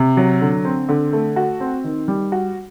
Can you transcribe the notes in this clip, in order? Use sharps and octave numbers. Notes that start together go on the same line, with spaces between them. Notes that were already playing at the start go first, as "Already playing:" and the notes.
Already playing: C3
F#3
D3
C4
D3
A3
F#4
C4
D#3
G3
F#4